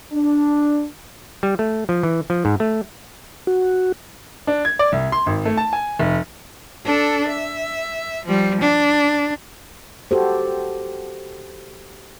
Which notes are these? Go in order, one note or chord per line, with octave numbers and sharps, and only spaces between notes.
D4
G3
A3
F3
E3
F3
G#2
A3
F#4
D4
G#6
D5
C2
C6
G#1
A3
A5
G#5
F1
D4 A4
E5
F3 G3
D4
F#4 G4 A4 C5